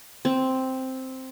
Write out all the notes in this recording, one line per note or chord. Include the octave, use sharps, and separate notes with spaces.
C4